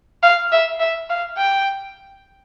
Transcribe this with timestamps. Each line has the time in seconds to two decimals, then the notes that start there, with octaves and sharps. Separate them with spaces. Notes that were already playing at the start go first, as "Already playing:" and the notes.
0.23 F5
0.52 E5
0.80 E5
1.10 F5
1.38 G5